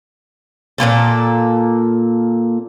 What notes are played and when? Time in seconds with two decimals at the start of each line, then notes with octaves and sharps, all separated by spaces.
0.78 A#2 E3 A#3 A4